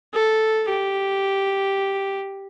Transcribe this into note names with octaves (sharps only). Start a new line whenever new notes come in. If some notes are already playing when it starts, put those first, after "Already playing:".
A4
G4